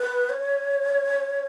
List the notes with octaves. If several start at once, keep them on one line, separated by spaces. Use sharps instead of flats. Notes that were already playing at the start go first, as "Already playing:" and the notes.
Already playing: B4
C#5